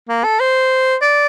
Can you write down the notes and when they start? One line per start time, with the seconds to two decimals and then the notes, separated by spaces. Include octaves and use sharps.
0.09 A#3
0.24 A4
0.40 C5
1.02 D5